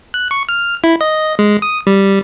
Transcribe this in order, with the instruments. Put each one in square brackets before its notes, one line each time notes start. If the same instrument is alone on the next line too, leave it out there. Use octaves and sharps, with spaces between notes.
[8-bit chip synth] F#6
C#6
F6
E4
D#5
G#3
D#6
G3